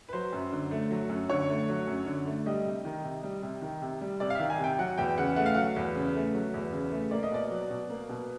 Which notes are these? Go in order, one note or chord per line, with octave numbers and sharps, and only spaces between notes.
B4
F#3 C5
F#2
D3
A3
F#3
F#2
D3 C#5
A3
F#3
F#2
D3
A3
G3 D#5
C3
D#3
C3
G3
C3
D#3
C3
G3
C3 D5
F5
D#3 E5
G#5
C3 G5
F#3 F#5
E2 G5
C#3 F#5
A3 F#5
F5
F#3 F#5
E2
C#3
A3
F#3
E2
C#3
A3
A#3 D5
D#5
B2 D5
F#3
B2
A#3
B2